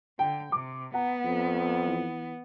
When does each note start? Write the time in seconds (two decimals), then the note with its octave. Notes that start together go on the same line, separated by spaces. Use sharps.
0.19 D3 G5
0.52 C3 D6
0.94 B3 F#5 A#5
1.25 F2
1.87 E3